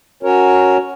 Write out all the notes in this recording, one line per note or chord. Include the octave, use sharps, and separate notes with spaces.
C#4 F#4 A#4 C#5